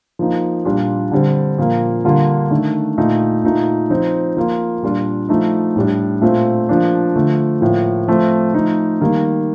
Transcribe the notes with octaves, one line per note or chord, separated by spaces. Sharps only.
F3 A#3 D#4
A#2 G3 D4 F4
D3 G3 C4
A#2 F3 A#3
D3 G3 A#3 F4
D#3 A3 D4
A#2 A3 D#4
A#2 A3 D#4
F3 C4 D#4
F3 A#3 F4
A#2 G3 D4 F4
F3 A3 D#4
A2 G3 D4
A#2 A3 C4 F4
F3 A#3 D4
D3 F3 A3
A2 F3 A#3 F4
F3 A3 C4 F4
F3 A3 D#4
D#3 G3 A#3